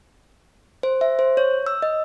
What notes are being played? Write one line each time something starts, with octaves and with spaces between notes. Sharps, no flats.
C5
E5
C5
C#5
E6
D#5